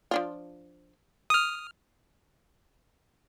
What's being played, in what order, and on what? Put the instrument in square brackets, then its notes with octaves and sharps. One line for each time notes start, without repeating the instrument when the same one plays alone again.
[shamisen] F3 D4 F4
[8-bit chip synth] D#6 F6